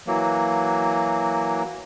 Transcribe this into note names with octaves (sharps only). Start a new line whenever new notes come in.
E3 F#3 A#3